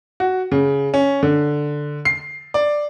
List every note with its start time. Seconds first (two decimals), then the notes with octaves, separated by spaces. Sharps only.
0.20 F#4
0.52 C#3
0.94 C#4
1.23 D3
2.05 C7
2.54 D5